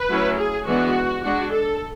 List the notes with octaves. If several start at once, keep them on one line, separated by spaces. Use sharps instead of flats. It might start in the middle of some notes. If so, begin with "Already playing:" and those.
Already playing: B4
F#3 A3 C#4 E4
G#4
E3 G#3 B3 D4 F#4
G#3 D4 F#4
A4